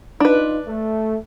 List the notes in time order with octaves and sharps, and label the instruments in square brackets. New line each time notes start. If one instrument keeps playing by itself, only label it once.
[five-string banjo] D4 B4 [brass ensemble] D#4 F4
[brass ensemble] A3